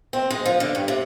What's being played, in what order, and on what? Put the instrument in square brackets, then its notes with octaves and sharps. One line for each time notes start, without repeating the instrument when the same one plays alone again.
[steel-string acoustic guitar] C4
G#3
F3
D3
G2
C3